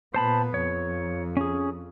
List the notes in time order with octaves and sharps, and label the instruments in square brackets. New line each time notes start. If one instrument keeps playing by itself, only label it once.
[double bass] A#2 B3 [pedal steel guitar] C5 A5 B5
[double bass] F2 [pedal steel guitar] C#5
[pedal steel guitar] C#4 G#4